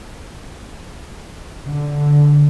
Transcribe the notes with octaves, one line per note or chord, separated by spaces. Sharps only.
D3